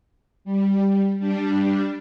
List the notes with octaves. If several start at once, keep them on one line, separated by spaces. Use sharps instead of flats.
G3
G3 D4